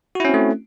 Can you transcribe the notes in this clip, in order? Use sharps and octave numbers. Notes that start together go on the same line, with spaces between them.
A3 C4 C#4 E4 F#4